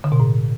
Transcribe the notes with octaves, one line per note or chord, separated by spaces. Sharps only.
D3
B2
A2